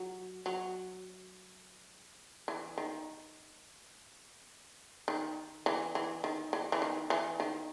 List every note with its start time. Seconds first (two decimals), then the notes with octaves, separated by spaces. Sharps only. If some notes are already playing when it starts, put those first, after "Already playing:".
Already playing: F#3
0.46 F#3
2.48 E3
2.78 D#3
5.08 D#3
5.66 E3
5.95 E3
6.24 D#3
6.53 E3
6.72 E3
6.82 D#3
7.10 E3
7.40 D#3